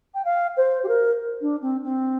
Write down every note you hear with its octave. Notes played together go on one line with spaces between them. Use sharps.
G5
F5
C5
G4
A#4
D4
C4
C4